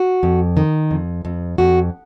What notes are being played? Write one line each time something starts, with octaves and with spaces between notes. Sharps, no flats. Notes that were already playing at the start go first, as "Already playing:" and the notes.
Already playing: F#4
F2
D#3
F2
F2
F2 F#4